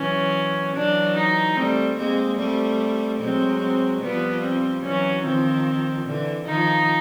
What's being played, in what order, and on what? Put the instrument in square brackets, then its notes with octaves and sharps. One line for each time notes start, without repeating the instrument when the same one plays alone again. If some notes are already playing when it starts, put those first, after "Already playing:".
Already playing: [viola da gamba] E3 F#3 [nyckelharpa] C#4
[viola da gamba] E3 F#3 [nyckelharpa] D4
[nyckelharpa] D#4
[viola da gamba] G3 A3 [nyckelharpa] C4
[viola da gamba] G#3 A#3 [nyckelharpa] C4
[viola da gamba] G3 A3 [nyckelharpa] C4
[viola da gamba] F#3 G#3 [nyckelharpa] C4
[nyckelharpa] C4
[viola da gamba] F3 G3 [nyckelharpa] B3
[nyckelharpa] C4
[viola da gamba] E3 F#3 [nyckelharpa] C#4
[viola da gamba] D#3 F3 [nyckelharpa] C4
[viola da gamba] D3 E3
[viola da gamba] D#3 F3 [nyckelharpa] D#4